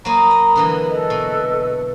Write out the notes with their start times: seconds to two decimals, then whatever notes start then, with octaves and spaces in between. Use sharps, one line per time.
0.05 F#3 A#3 G#5 A#5 B5 D#6
0.31 D#5
0.56 D3 E3 F#3
0.89 A4 B4 D#5
1.10 B2